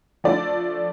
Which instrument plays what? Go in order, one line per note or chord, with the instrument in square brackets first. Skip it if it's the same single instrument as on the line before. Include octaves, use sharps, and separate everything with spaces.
[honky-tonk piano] F3 A3 D4 D5